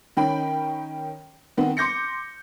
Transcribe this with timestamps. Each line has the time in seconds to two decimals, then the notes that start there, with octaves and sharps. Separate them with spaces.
0.17 D#3 C#4 G5 B5
1.57 D#3 B3 C4
1.77 C6 D6 G6 A#6 C#7